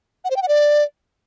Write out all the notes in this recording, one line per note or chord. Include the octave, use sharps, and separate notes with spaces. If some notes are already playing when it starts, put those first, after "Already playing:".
F#5
C5
G5
F#5
D5